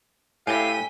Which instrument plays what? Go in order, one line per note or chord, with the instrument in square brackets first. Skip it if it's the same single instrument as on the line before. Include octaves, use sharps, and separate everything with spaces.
[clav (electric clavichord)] A2 [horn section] E4 G4 F5 [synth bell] G#5 G7 [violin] B6 D#7